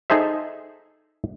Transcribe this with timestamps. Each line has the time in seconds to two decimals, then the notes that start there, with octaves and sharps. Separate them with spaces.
0.10 D#4 G#4 A4 C5 E5